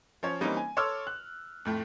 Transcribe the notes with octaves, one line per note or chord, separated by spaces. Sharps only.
F3 C#4 C#5
E3 G3 A#3 C4 C#4 D#4
G#5
A4 C#5 C6 D6 E6 F6
F#6
F2 A2 A3